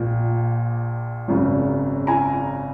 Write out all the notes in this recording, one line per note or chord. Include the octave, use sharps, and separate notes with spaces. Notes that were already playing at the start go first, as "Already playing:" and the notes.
Already playing: A#1 A#2
G#1 F#2 C#3
G#5 A#5